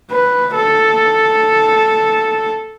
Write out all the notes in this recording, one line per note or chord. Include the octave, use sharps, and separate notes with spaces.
B4
A4